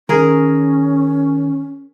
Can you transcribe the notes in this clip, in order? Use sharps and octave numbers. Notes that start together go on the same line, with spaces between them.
D#3 C#4 G#4 A#4